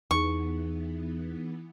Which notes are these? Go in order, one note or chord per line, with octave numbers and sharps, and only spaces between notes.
E2 E3 B3 D#4 G#4 C#6